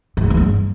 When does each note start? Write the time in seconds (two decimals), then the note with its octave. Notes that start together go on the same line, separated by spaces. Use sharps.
0.17 G#2
0.24 F2
0.30 E2
0.37 G2